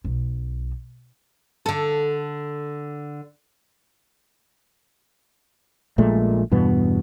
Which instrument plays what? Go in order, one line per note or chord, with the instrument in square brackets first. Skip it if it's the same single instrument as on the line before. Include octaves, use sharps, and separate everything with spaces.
[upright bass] B1
[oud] D3 A4
[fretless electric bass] A#1 A#2 G#3 A3
E2 G2 B2 B3